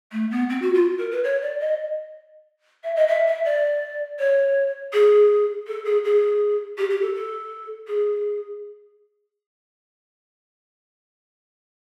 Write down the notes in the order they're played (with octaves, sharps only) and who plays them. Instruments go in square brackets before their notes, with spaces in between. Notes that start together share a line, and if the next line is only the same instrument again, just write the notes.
[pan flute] A3
B3
C4
F#4
F4
A#4
B4
C#5
D5
D#5
E5
D#5
E5
E5
D5
C#5
G#4
A4
G#4
G#4
G4
G4
A4
A4
G#4